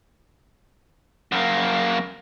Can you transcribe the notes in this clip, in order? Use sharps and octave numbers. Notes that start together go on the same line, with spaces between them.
F#2 A#3